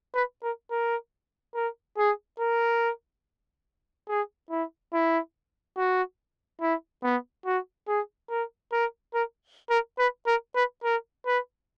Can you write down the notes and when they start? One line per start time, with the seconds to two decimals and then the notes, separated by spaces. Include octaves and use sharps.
0.14 B4
0.43 A#4
0.71 A#4
1.55 A#4
1.98 G#4
2.40 A#4
4.09 G#4
4.51 E4
4.93 E4
5.77 F#4
6.61 E4
7.03 B3
7.46 F#4
7.88 G#4
8.30 A#4
8.72 A#4
9.14 A#4
9.70 A#4
9.98 B4
10.27 A#4
10.55 B4
10.84 A#4
11.26 B4